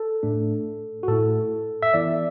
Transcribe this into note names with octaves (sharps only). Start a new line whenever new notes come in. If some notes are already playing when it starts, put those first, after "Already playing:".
Already playing: A4
A2 A3 D4
F#4
A2 A3 E4 A4
E5
E3 B3 E4 D5